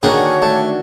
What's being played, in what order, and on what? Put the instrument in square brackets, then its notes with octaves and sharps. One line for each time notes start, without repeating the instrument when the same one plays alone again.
[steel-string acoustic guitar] D3 D#3 F#4 [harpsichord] A#3 D#4 G#4 [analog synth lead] D4 [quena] C#5
[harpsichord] A3 [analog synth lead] D4